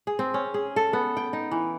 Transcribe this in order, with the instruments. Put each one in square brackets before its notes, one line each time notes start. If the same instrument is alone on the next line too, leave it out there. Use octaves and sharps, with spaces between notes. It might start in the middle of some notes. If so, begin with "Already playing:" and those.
[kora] G#4
C4
C#4
G#4
A4
B3
G5
D#4
E3